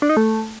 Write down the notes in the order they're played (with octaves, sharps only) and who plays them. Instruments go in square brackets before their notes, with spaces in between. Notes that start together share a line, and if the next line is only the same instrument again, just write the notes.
[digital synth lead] D4
D#4
A3